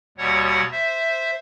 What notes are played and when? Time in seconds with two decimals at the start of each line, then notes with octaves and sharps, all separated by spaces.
0.18 D#2 B2 G3 C#5 F#5
0.72 C5 E5